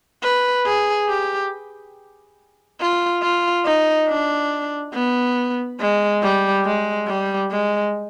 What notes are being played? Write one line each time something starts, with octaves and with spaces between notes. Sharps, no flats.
B4
G#4
G4
F4
F4
D#4
D4
B3
G#3
G3
G#3
G3
G#3